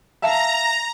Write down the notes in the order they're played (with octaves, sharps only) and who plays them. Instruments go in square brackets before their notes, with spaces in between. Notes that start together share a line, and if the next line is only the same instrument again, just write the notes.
[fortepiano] E5 F5 A5 [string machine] A#5